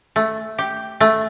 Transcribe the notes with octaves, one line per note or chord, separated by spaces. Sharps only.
A3
G4
A3